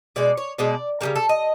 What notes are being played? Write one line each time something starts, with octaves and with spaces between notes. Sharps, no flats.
B2 G#3 D5
C#5
B2 G#3 D5
C#3 E3 G3 A#4
A4
D#5